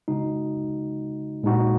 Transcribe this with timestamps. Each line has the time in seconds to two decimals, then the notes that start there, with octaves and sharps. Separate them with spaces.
0.08 C#3 G#3 D#4 F#4
1.43 A#2 G#3 D#4 F#4